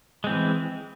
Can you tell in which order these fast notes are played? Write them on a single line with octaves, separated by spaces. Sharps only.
G#3 C4 E3